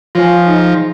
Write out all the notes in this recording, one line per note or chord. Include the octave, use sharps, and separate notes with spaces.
F3 F4 C#5 F5 G#5
D#4 G#4 D#5